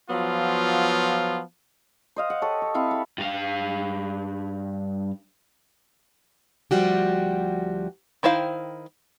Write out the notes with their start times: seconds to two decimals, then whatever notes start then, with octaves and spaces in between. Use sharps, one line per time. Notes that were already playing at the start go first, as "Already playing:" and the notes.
0.10 F3 F#3 B3 F4
2.16 C5 D#5 F5
2.30 F#5
2.42 G4 A4 C#5
2.62 C#5
2.74 C4 E4 F5 C#6
2.91 B5
3.18 G2 F5
6.71 D2 F3 G3 F#4 G4
8.23 D#3 E4 C5 F5 G5